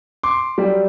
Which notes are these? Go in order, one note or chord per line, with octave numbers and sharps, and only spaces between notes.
C6 D6
F#3 G3